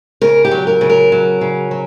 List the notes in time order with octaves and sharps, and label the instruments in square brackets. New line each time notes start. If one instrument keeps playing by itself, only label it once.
[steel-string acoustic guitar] C#3 A#4
G4
F#3
A#4
C#3
A#4
F#3
C#3
F#3